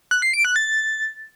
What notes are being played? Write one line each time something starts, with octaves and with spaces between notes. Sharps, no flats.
F#6
C7
D7
F#6
A6